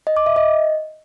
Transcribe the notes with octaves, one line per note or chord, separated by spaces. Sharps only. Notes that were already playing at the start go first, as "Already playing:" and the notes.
D#5
D6
E5
D#5